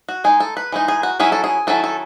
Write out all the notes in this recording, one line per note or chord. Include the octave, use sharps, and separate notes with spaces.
F#4
G#3 D#4 G#4
A4
B4
E3 G#3 D#4
G#4
F#4
F#3 C#4 E4 G#4
A4
G#4
D#3 F#3 C#4 E4 A4
A4